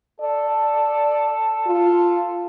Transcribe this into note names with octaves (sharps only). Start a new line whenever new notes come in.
A4 D5
F4